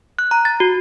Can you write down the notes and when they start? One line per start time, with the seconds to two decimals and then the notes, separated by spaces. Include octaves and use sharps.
0.19 F#6
0.31 A#5
0.45 A6
0.60 F#4